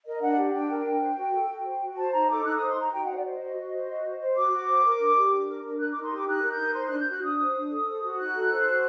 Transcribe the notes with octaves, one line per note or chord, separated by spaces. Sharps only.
A#4 D#5
D4 F#5
G4
D4 G5
A#4
G5
D4
C5
F#4
A4
F#4
C5
F#4
C5 A5
D#4 A#5
A4 D6
D#4 F#6
C5 D#6
C6
D#4 A#5
F#4 G5
C5 F#5
D5
C5 D#5
F#4
F#4
C5
F#4
C5
C5
F#4 D6
F#4
C5
A#4
D4
G4
D4
A#4
D4
A#4 F#6
D#4 D6
C6
G4 D6
D#4 F#6
A#4
G6
D#4
C5 C6
D4 F#6
G6
F#4 F#6
D4 D#6
C5
D4
A4
C5
F#4
D#4 F#6
A4
C5
F#4